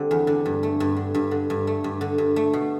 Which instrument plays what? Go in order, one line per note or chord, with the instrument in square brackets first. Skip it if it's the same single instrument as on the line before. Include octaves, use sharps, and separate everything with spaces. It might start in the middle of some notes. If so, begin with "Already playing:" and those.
Already playing: [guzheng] D3 G3 C4
E2
D3
G2
A3
G2
D3
G2
D3
G2
A3
G2
D3
G2
A3
B2